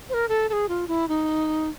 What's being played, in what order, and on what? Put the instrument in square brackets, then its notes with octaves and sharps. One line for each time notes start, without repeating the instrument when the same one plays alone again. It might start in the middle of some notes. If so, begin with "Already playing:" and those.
[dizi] C5
A#4
A4
A4
G#4
F4
E4
D#4